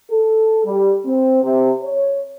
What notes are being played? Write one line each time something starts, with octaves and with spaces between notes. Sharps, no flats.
A4
G3
C4
C3
C#5